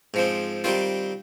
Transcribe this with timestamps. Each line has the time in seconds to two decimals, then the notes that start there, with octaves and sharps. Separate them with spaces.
0.14 G#2 F3 C4
0.64 D#3 G3 C4 F4